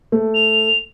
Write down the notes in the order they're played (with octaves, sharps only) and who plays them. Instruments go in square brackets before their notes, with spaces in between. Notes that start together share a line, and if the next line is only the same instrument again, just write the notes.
[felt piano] A3
[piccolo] F7